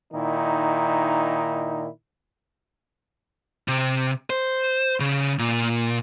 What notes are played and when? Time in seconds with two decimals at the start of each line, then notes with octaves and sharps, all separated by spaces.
0.13 A#2 D#3 D#4 E4
3.68 C3
4.30 C5
5.00 C#3
5.39 A#2